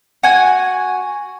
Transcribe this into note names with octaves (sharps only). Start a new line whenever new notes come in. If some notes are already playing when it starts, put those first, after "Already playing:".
F#4 G#5